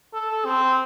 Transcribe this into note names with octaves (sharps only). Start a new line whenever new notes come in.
A4
C4